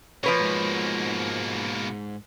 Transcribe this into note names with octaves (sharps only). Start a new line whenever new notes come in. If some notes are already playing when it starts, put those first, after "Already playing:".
B2 F3 A#3 B4 C#5
G#2 G#3